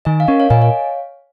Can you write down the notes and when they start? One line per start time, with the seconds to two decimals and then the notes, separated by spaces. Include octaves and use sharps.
0.05 D#3 D#5 G#5
0.20 F5
0.28 C#4 A#4 D#5
0.40 C#5 F5
0.50 A#2 D#5 G#5
0.62 C#5 F5